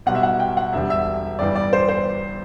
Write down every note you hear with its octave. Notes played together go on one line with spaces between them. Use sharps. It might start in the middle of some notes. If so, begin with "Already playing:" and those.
B1 B2 G3 F#5
E5
F#5
G5
F#5
E1 E2 D3 G3 E5
E5
G1 G2 E3 G3 D5
D5
C5
C5